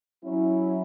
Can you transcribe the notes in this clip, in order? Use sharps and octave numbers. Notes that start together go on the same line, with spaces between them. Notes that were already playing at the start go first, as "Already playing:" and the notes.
F#3 C#4 E4